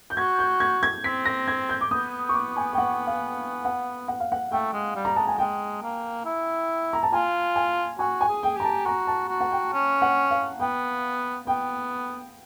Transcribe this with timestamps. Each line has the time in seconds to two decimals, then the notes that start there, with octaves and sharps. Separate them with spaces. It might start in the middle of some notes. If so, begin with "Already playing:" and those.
0.10 G6
0.17 F#4 G#6
0.39 G6
0.60 G#6
0.83 G#6
1.04 C4 B6
1.25 A#6
1.48 G#6
1.69 G6
1.81 D6
1.91 B3 D#6
2.29 C#6
2.34 D6
2.57 G#5
2.73 G5
2.78 F#5
3.07 F5
3.65 F#5
4.08 F#5
4.20 F5
4.32 F#5
4.52 A3 G5
4.73 G#3
4.95 G3
5.05 A#5
5.16 G#3 A5
5.27 G#5
5.38 G#3 G5
5.82 A#3
6.26 E4
6.93 A#5
7.03 A5
7.12 F4 G#5
7.56 G#5
7.99 F#4 G#5
8.21 G#5
8.28 G#4
8.43 G5
8.57 G4 A#5
8.64 A5
8.86 F#4 A#5
9.07 A5
9.29 F#4
9.40 F#5
9.51 G5
9.73 C#4
10.02 F#5
10.31 F5
10.60 B3 G5
11.47 B3 G5